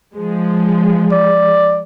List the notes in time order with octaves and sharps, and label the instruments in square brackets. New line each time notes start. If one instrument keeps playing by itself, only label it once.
[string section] F3 G#3
[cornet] D5